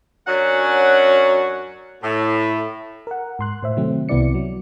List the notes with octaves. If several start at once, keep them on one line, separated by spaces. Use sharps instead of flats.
F#2 F#3 C#4 D4 F#5
A2
A#4 F#5
G#2 C6 F#6
A2 C5 E5
C3 D#3 F#3 A3 C4
C2 C3 B3 E4 D5 C#7
F#3